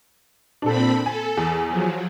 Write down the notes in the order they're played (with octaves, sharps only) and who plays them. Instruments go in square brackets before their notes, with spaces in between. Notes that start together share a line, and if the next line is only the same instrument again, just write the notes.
[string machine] A#2 C4 B5 [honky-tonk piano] D4 A4
[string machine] A4 [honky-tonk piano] G#5
[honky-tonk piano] E2
[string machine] F3 F#3